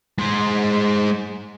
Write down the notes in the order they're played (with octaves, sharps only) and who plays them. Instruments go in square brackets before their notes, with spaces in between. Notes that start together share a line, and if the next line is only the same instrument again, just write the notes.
[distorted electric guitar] G#3 C5